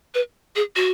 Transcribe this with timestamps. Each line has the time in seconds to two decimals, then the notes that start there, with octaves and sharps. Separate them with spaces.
0.14 B4
0.56 G#4
0.76 F#4